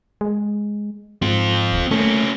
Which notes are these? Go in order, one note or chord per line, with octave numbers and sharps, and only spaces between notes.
G#3
G#2 C4 F4
D#1
A3 A#3 C#4